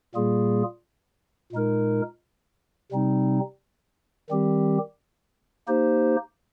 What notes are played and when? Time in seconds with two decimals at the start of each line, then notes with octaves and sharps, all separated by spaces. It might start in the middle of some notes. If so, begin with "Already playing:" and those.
0.15 A#2 G3 A#3 F4 G#4
1.52 A#2 G#3 D#4 A#4
2.91 C3 G3 C4 D#4
4.30 D#3 G3 C4 G4
5.68 A#3 D#4 G4 C5